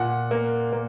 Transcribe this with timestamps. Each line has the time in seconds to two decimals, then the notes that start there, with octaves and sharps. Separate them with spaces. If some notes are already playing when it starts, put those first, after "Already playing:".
Already playing: A#2 F#5
0.31 A#3
0.72 A#3